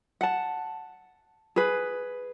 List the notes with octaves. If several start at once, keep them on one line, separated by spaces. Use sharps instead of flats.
F#5 A5
G#4 B4